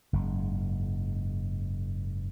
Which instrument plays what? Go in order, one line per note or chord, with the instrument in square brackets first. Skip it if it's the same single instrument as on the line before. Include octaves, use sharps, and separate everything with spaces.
[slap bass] F#1 G#2